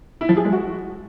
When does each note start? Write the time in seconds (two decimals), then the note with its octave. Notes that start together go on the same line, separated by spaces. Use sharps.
0.21 E4
0.29 F3
0.37 G#4
0.45 G#3
0.53 F#4